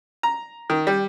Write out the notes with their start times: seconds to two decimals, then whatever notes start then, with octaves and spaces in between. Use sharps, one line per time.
0.23 A#5
0.70 D#3
0.87 G3